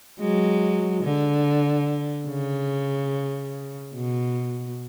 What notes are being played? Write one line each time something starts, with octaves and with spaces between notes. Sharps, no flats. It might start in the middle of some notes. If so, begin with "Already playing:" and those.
F#3 G#3
D3
C#3
B2